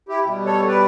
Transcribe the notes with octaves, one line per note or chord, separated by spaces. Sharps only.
E4 G4
B2 G3
A4 C#5
B4 D5